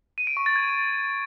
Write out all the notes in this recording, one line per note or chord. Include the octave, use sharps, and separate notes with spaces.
D#7
D7
C#6
A6
G#6